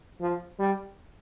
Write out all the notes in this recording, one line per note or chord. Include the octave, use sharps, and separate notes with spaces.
F3
G3